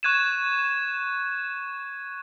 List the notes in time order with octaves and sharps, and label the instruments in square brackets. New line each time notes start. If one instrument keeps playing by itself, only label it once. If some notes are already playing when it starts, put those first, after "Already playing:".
[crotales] C#6 F#6 G#6 D#7 E7